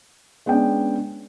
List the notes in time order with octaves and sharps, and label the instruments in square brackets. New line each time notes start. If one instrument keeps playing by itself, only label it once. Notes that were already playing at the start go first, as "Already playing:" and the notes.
[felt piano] G#3 B3 C#4 D4 G5